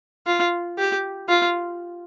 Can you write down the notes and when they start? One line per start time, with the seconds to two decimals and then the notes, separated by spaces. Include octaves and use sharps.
0.27 F4
0.79 G4
1.29 F4